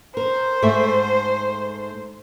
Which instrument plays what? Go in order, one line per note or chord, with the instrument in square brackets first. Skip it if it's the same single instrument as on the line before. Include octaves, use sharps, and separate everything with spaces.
[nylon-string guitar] A#4 [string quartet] C5
[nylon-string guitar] G#2 A3 E5